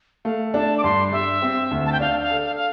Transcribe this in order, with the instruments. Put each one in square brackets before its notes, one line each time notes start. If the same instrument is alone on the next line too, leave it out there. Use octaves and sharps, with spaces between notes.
[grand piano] A3 [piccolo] F5
[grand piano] D4 [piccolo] A5
[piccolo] D6
[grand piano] G2 [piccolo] C6
[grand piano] G3 [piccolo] E5
[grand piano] C4
D2
[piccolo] A5
G5
[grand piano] D4 [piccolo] F5
[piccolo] F5
[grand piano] A4
[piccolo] F5
F5